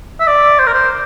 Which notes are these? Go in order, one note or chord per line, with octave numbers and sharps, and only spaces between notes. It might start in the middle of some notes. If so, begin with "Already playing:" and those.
E5
D5
C5
A#4
C5